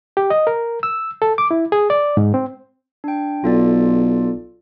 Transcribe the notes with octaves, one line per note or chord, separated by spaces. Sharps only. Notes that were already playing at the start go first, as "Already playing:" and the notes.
G4
D#5
A#4
E6
A4
D6
E4
G#4
D5
G#2
C4
D4 G5
B1 F4 A4 D5